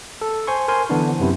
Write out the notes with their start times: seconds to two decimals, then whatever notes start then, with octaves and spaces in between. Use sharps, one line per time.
0.22 A4
0.47 C5 G#5 C6 C#6
0.68 A#4 C5 G#5 C6
0.89 D3 E3 B3 D4 E4
1.20 F#2 C3 B3 E4